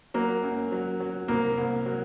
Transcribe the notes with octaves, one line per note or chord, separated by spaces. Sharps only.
F#3 A#3
F#2
F#3
F#3
C2 A#3
C2
F#3